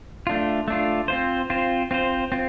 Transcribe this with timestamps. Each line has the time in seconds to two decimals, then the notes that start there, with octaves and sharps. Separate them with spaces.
0.27 A3 D4 F4
0.68 A3 D4 F4
1.08 C4 F4 C5
1.50 C4 F4 C5
1.91 C4 F4 C5
2.32 C4 F4